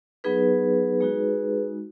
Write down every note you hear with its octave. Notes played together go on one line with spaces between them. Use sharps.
F#3 B3 D#4 G#4 B4
G#3 D#4 F#4